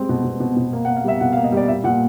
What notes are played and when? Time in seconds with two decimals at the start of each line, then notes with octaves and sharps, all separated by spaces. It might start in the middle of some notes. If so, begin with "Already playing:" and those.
Already playing: G3 G#3 C4
0.09 B2
0.24 B2
0.40 B2
0.57 B2
0.73 A#3
0.85 F#5
0.88 A#3
0.97 F5
1.04 G3 E5
1.21 B2 F#5
1.33 F5
1.37 A#3
1.44 D#5
1.52 G3 D5
1.68 A#2 E5
1.84 A#2 F#5